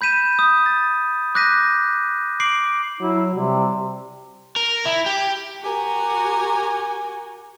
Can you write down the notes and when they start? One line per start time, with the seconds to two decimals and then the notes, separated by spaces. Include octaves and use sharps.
0.01 B5 G6 B6 D#7 E7
0.39 D#6 G6
0.66 A6
1.35 D6 F#6 G6 A#6 B6 D#7
2.40 D6 C7 D7 F#7
3.00 F#3 E4
3.34 C3 G3
4.56 A#4
4.85 E4
5.06 G4
5.63 F#4 G4 A#4 G#5